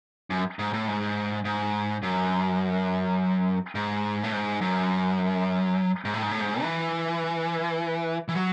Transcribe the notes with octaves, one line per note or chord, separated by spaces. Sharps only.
F#2
G#2
A2
G#2
G#2
F#2
G#2
A2
G#2
F#2
G#2
A2
G#2
A2
G#2
E3
E3
F#3